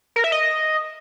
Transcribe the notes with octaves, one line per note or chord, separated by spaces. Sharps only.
A#4
E5
D#5